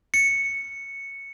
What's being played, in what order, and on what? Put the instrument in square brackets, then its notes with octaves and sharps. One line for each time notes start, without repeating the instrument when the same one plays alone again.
[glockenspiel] C#7